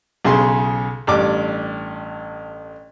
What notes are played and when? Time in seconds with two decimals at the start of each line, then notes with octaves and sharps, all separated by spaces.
0.25 B1 C#3 G#4 C6
1.07 A1 G2 D6